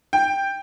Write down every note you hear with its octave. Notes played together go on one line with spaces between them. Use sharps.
G5